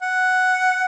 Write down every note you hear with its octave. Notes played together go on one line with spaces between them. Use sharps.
F#5